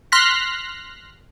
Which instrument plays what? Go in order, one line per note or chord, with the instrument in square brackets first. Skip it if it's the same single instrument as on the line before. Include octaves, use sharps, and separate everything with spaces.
[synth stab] C6 F6 F#6 A#6 B6